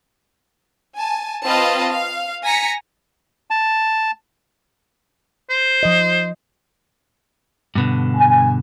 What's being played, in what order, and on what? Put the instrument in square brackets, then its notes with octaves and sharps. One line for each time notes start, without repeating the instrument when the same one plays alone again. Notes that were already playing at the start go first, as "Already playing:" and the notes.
[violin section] G#5 A5
C4 F4 B4 D#5 F5 A5
F5
G#5 A#5 A#6 B6 C#7
[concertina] A5
[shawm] C5
[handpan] F3 D#5
[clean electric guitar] G2 B2 D3
[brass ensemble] G#5